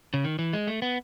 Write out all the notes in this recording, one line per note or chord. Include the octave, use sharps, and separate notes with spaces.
C#3
D#3
E3
G#3
A3
B3